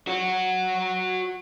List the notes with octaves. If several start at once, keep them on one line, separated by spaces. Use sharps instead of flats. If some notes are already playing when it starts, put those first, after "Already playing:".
F#4 C#5